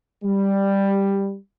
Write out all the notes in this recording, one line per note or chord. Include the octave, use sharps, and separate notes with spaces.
G3